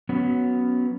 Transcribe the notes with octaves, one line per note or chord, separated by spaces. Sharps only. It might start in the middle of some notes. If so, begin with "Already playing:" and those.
F#3 B3 C#4 F#4